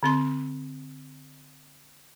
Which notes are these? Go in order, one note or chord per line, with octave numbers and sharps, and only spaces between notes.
D3 C4 C6